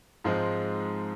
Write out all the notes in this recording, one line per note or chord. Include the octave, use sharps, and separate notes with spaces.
G#2 F3 G#3 C4 D#4